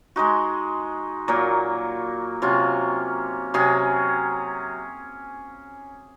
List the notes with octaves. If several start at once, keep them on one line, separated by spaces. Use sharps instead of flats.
G#3 D#4 F#4
A#2 F#3 A#3
C3 F#3 C#4 F4
C3 F#3 C#4 G#4